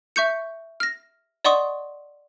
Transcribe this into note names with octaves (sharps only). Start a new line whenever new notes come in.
E5 C#6 G6 C#7
F6 A#6
D5 D#5 F#5 C6 C#6 D#6